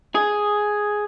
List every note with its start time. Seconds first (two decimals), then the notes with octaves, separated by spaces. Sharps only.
0.15 G#4